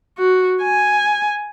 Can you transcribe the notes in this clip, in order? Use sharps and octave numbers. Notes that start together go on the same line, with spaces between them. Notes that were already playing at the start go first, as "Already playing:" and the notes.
F#4
G#5